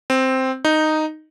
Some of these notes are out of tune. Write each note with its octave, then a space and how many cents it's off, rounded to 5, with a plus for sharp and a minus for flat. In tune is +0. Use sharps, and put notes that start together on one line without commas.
C4 +0
D#4 -5